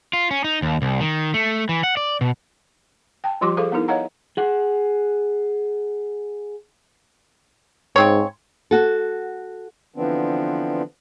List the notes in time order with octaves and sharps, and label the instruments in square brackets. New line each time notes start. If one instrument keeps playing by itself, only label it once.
[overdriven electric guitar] F4
C#4
D#4
D#2
C2
D#3
A3
E3
F#5
D5
B2
[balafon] G5 A5
F3 G3 F4 G4 C6 D6
G#4 A4 C5 F5
B3 D#4 E4 A#4
C#5 D#5 F5 F#5 A#5
[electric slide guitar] G#4 F#5
[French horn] G#2 [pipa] C#3 C4 C#5
[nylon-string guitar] F#4 A4
[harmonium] D3 E3 F3 B3 C4 D4